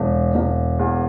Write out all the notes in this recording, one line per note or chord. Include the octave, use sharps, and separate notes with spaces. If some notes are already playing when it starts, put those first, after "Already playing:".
Already playing: E1
E1
E2